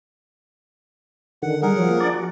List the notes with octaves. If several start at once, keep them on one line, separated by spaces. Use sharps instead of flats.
D3 D#3 F#5
G3 G#4 A#4 F#5
F3 F#3
A#3
D4 D5
F#4